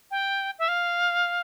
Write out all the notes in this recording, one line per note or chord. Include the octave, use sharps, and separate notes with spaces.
G5
E5
F5